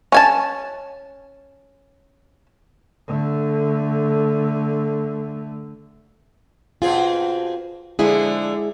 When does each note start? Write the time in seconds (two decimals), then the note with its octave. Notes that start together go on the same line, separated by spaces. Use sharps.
0.12 C#4 G#5 A5
3.08 D3 A3
6.82 B2 C4 F4 G#4
7.99 D3 F3 G#3 E4 G#4